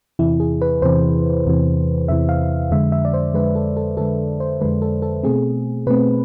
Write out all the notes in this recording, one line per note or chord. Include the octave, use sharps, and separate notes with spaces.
E2 C3 E3 E4
G#4
B4
E2 C3 E3 C5
E2 C3 E3
E2 C3 E3 E5
F5
F2 D3 G#3 E5
E5
D5
C5
F2 D3 G#3 B4
A4
A4
F2 D3 G#3 A4
C5
F2 D3 G#3 B4
A4
A4
B2 A3 C4 G#4
B2 A3 C4 B4